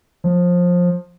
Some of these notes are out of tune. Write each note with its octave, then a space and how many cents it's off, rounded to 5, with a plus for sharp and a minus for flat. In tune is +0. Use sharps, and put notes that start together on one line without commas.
F3 +20